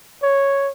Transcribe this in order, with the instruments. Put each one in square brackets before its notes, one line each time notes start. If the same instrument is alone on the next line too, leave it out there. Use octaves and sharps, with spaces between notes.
[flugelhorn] C#5